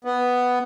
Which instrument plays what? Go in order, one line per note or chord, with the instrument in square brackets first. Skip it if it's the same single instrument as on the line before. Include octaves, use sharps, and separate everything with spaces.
[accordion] B3